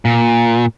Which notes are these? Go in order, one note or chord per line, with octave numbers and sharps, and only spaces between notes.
A#2